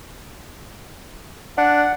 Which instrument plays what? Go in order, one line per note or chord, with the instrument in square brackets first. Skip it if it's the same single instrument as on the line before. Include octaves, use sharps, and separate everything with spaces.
[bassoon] D4 [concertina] F#5